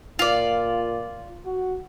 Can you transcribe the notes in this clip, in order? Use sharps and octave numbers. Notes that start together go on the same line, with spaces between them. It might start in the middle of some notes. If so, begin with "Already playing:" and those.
A#2 F4 D5
F#4